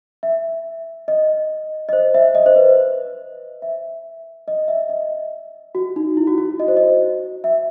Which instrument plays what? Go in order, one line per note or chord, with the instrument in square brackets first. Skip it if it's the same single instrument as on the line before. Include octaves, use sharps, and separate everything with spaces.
[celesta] E5
D#5
D#5
C5
E5
D#5
C5
B4
E5
D#5
E5
D#5
F#4
D#4
E4
F#4
F#4
D#5
C5
D#5
E5